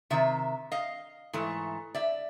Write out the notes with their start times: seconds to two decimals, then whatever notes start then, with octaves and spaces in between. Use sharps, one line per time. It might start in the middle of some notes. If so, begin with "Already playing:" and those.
0.10 C3 D#3 E5
0.72 D#5 F5
1.33 G#2 E3 A3
1.95 D5 E5